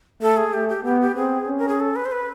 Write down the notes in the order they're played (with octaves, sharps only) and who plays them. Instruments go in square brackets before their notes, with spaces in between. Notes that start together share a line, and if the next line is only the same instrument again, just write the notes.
[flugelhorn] A3 [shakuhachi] A4
[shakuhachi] G#4
[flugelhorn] A3 [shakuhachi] G4
[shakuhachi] G4
[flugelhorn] B3 [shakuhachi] G4
[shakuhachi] G4
[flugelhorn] C4 [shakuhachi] G#4
[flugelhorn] C#4
[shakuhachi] A#4
G#4
A4
B4
C5
B4